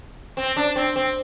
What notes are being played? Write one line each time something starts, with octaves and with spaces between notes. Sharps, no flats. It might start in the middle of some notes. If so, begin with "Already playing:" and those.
C4
D4
C4
C4